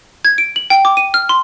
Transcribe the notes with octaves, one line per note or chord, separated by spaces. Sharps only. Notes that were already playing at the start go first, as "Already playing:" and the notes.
G#6
D7
F#7
G5
D6
D#7
F6
C6